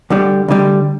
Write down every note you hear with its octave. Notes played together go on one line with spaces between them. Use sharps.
D2 D3 G3
D2 D3 G3